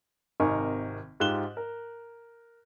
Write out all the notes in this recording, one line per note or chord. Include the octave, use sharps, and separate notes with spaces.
G#1 C3 D#4 A#4 G#5 C#6
G#2 F4 G4 F#6 E7 G7
A#4